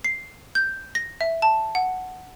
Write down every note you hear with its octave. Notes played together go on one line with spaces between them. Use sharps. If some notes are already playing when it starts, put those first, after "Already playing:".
C7
G6
A#6
E5
A5
F#5